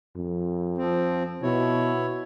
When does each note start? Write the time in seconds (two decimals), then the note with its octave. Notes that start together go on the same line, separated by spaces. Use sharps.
0.16 F2
0.78 F3 C4
1.43 B2 E4 C#5